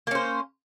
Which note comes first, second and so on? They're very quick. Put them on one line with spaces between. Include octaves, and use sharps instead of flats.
A#3 C#4 C5